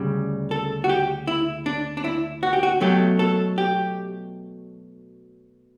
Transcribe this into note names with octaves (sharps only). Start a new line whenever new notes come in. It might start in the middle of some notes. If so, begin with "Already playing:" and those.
Already playing: D2 C#3 G3
A4
F#4
G4
E4
D4
D4
E4
F#4
G4
F#4
B2 F#3 A3 G4
A4
G4